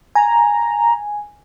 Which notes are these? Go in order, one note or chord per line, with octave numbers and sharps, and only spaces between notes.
G#5 A#5